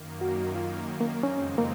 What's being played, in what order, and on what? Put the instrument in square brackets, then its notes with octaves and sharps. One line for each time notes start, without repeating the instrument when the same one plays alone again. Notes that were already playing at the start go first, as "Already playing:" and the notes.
Already playing: [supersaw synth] F#2 D#3 A#3
[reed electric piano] F#4
F4
A#3
[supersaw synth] F2 C#3 G#3 C4 D#4 [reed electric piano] C#4
[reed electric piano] A#3